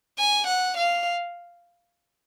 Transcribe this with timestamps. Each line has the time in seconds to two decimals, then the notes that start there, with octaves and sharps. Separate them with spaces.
0.19 G#5
0.47 F#5
0.77 F5